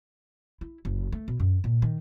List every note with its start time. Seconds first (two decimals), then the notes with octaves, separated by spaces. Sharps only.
0.61 E4
0.85 F#1
1.12 A3
1.28 B2
1.40 F#2
1.64 A#2
1.82 D#3